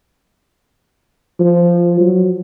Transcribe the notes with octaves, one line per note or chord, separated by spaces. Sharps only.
F3
F#3